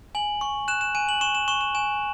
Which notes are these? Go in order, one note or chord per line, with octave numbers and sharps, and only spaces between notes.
G#5 F#7
C#6
F#6 E7
E7
G#5 D#7
F#7
C#6 E7
E7
C#6 E7
E7
G#5 E7